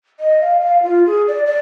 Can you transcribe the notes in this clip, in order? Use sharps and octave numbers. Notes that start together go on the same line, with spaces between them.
D#5
F5
F5
F4
G#4
D5
D5